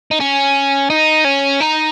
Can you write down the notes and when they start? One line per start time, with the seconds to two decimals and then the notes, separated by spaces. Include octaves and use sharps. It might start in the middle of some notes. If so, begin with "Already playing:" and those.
0.11 D#4
0.20 C#4
0.90 D#4
1.24 C#4
1.60 D#4